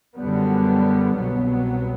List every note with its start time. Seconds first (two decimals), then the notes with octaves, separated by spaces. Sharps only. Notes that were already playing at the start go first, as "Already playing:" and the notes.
0.17 F#2 D3 G3 B3
1.16 C2 B2 F#3 B3